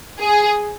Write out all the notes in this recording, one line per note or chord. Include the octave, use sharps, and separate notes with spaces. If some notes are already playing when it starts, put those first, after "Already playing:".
G#4